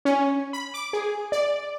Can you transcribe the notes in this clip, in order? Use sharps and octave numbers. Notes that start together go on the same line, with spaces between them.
C#4
B5
D6
G#4
D5